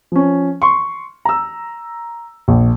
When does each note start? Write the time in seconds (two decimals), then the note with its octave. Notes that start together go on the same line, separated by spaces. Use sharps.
0.12 F3 C#4
0.62 C6 C#6
1.25 A#5 E6
2.48 A#1